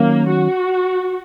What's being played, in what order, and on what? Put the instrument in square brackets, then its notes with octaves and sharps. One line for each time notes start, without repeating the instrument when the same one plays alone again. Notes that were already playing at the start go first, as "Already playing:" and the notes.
Already playing: [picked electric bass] D#3 F#3 C#4 [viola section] A#3
[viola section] F#4